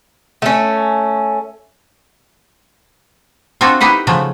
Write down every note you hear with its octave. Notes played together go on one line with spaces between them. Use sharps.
A3 C#4
C4 D4 F4 F#4 A4
D#4 E4 G4 B4 F#5
C#3 F3 F#3 A3